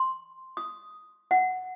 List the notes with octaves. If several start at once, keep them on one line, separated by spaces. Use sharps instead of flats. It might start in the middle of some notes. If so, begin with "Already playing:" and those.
Already playing: C6
D#6
F#5